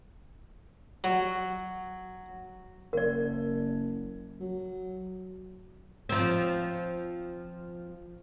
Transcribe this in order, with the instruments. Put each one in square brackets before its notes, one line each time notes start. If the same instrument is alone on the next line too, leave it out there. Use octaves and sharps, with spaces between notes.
[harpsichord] F#3
[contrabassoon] F#1 [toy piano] A#4 D5
[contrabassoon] F#3
[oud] F3 C4